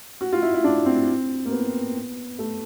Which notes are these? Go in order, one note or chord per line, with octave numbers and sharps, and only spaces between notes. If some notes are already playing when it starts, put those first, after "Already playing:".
F#4
F4
E4
E4
D4
C4
A#3
B3
A3